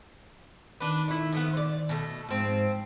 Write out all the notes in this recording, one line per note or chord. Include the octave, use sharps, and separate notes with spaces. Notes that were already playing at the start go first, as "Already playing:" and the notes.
D#3 D4 B4
A3 E4
F3 A3 B3
C5 D5
B2 A3
G#2 F3 C4